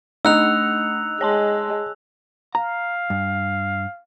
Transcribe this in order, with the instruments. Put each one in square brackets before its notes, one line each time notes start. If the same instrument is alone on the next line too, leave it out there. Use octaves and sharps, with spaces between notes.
[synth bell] A3 D4 C#7 [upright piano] D#4 [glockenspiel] E6 F#6 F7
[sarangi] G#3 [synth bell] C#5 A5 C6
[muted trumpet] F5 [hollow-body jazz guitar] A#5
[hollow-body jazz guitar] G2